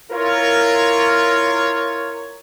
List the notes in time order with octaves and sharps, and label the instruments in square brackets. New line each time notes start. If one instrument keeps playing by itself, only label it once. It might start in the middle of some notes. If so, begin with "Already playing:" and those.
[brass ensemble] E4 F4 A#4 C#5